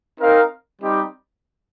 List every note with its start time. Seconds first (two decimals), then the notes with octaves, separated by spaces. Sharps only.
0.20 C4 D#4 A#4 F5
0.81 G3 C4 D#4 G4